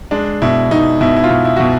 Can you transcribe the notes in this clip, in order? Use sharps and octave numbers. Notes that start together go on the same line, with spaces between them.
G#3 D4
B2 E4
B2 D#4
B2 E4
E4
F4
B2
E4
B2 F#4